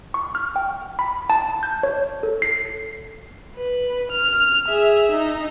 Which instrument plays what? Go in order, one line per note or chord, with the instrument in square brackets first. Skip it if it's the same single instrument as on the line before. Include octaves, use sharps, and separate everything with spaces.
[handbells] C#6
F6
G5
B5
A5
G6
C#5
A4
C7
[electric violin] B4
F6
G#4 E5
D#4